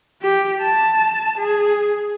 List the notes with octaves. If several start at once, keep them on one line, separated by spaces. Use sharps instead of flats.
G4
A5
G#4